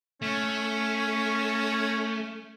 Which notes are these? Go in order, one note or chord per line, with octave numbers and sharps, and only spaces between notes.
A3 C#4